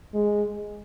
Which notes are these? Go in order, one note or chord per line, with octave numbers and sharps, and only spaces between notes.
G#3